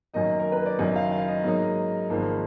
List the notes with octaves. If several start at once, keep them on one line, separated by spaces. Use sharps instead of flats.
F#2 D#3 F#3 A#3 D#4 D#5
A#4
B4
D5
F#1 F#2 D#3 F#3 D#5
F5
F5
D#5
G#2 F#3 A#3 D#4
G#1 G#2 F3 A#3